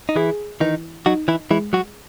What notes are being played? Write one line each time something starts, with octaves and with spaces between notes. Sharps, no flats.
D#4
E3 E4 G#4
D#3 E3 D#4
F#3 D#4 F#4
E3 E4
E3 G#3 E4
F#3 F#4